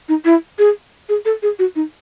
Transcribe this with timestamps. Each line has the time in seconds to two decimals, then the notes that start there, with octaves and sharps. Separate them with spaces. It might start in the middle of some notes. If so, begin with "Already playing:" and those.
0.09 D#4
0.25 E4
0.59 G#4
1.09 G#4
1.25 A4
1.43 G#4
1.59 F#4
1.76 D#4